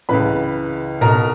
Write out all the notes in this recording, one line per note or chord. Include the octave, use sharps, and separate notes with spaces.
C#2 C#3 E3 B4 B5
B1 B2 A#4 A#5